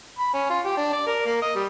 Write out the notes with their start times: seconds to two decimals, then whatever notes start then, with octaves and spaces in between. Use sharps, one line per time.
0.19 B5
0.34 C#4
0.50 F4
0.66 G4
0.77 D4
0.93 D5
1.07 A#4
1.26 A#3
1.42 D#5
1.55 G3